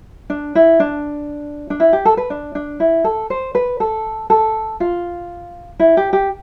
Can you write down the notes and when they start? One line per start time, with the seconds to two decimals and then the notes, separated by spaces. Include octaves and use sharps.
0.30 D4
0.55 E4
0.80 D4
1.70 D4
1.80 E4
1.93 G4
2.05 A4
2.17 B4
2.30 D4
2.55 D4
2.80 E4
3.04 A4
3.30 C5
3.55 B4
3.80 A4
4.30 A4
4.80 F4
5.79 E4
5.97 G4
6.13 G4